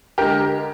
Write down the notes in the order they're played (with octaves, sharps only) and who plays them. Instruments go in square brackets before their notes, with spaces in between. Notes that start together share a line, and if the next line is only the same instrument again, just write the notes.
[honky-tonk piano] D3 G#3 G4 A#4